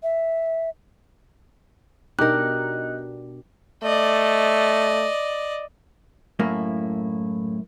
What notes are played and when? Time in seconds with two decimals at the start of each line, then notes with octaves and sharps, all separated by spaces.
0.03 E5
2.19 B2 D4 D#4 G4 A#4 F#6
3.83 A3 D5 D#5
6.39 F#2 A2 A#3 E4